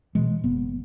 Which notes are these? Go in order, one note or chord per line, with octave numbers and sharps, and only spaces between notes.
B2 E3 G#3
F#1 B3